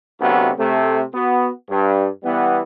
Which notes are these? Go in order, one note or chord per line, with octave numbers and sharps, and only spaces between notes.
D2 C3 F#3 A#3 B3
C3 A3
B3 F#4
G2
E3 G3 B3